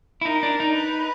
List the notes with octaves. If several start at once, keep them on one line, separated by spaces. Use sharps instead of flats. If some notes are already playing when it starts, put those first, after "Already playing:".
E4
D#4 A#4
D4
D#4
B4